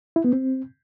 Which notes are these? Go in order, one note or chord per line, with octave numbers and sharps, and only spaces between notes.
E4
B3
C4